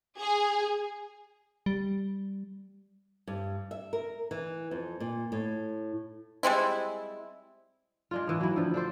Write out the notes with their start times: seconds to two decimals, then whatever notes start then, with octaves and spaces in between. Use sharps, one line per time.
0.17 G#4
1.66 G3
3.27 G2
3.71 E5
3.93 A#4
4.31 E3
4.71 F2
5.00 A#2
5.32 A2
6.43 G3 G#3 C4 E4
8.11 G#3 D4 F4
8.27 A2 E3
8.41 F#3 E4
8.56 D3 F3
8.74 D4 A4 C5